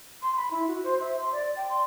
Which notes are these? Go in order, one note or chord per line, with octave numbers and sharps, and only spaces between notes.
C6
B5
E4
F#4
C5
E5
C6
D5
G5
C6